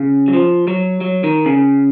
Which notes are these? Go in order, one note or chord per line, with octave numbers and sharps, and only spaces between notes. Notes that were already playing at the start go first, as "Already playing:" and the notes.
Already playing: C#3
F#3
F3
F#3
F#3
D#3
C#3